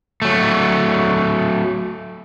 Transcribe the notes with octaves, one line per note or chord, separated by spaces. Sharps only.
F#3 A3